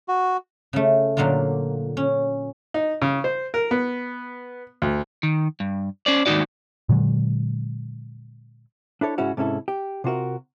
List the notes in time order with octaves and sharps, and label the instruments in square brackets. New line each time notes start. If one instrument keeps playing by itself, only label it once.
[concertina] F#4
[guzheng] C#3 A3
A#2 D3 F#3 A#3 F4
C#4
[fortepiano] D#4
C#3
C5
A#4
B3
D2
[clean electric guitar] D#3
G2
C#4 C5 D5
D#2 G#2 B2 D#4 F#4 D5
[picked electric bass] A#2 D3 F#3 G#3
[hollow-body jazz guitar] D4 E4 A4 C#5
G#2 C#3 C#4 E4 F#4
G#2 C3 C#4 E4 A4
G4
C3 F4 F#4 A#4